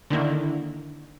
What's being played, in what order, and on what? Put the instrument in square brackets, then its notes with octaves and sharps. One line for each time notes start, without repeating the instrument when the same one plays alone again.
[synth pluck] D3 D#3 A#3 E4